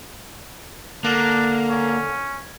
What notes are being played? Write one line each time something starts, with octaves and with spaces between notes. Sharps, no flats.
D3 A#3 D4
C#4